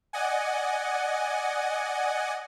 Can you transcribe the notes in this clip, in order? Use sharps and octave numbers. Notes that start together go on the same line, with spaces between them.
D5 D#5 F#5 G#5